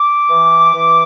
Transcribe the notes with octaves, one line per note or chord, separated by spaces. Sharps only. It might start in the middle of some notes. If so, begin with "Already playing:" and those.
Already playing: D6
E3
E3